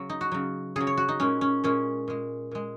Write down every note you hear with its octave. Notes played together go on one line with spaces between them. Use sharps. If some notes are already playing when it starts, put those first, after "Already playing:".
Already playing: C#3 F#3
D#4
F#4
C#3 F#3
C#3 F#3 G#4
C#5
F#4
D#4
A#2 G#3 C#4
C#4
A#2 G#3 C#4
A#2 G#3
A#2 G#3